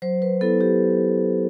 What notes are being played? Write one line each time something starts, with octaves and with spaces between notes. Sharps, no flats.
F#3 C5
B4
B3 E4 A4
G4